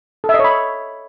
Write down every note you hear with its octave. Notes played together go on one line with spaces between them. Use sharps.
A4
E5
D#5
C#5
B5